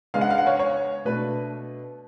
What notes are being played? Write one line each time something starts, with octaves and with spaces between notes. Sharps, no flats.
C#3 G#3 B3 D4 F5
F#5
F5
F#5
C#5 F5
C#5
B2 A3 D4 B4